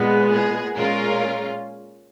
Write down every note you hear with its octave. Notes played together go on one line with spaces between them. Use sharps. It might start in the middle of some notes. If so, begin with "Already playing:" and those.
Already playing: A#2 G#3 B3
G#4
A#2 G#3 C#4 F4 A#4